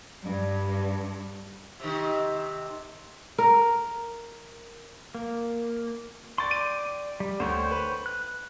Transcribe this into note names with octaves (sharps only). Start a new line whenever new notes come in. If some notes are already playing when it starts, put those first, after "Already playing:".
G2
C3 D#3
A#4
A#3
D5 G5 C6 C#6 A6
D#7
G3
D2 C5 C#5 G5
B4
F#6